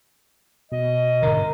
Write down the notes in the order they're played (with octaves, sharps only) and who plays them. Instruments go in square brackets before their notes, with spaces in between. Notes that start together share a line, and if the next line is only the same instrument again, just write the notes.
[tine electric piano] B2 [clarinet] D#5
[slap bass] G#2 D3 [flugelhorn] A#4